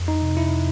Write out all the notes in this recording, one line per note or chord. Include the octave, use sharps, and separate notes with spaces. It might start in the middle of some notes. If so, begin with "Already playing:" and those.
Already playing: F2
D#4
C3
E4